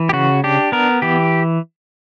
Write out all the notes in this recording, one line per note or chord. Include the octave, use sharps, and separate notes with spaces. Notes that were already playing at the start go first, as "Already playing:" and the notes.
Already playing: E3
G4
C#3 F#4
D4 G4
B3 A#4
E3 G4